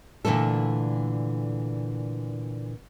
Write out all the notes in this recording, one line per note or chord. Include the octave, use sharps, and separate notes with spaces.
A#2 D3 E3 A3 A4